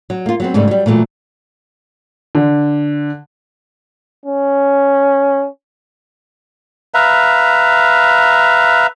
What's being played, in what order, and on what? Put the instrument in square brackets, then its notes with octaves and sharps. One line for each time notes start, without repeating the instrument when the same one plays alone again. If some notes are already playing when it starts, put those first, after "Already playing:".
[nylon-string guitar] F#3
A#3 F4
F#3 B3 C4
G#2 C#3 G3 A3
F#3 G3
A#2 E3 F#3 A3 A#3
[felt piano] D3
[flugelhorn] C#4
[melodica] B4 E5 F5 A#5